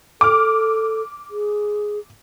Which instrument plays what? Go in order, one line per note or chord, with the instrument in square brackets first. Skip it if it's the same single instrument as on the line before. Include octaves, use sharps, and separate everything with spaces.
[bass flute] A4 [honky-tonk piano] D6 F6
[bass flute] G#4